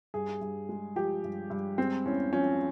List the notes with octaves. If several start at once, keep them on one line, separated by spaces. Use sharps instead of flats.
G2 G#4
G2
G#3
F3 G4
G2
G2
G#3 C4
E2 C#4
F3 C#4